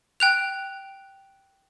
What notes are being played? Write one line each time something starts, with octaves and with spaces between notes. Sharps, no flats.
G5 F#6 F7